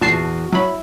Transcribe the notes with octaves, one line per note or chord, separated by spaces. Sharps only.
E2 A#2 F#4 A5 C7
F#3 E4 B5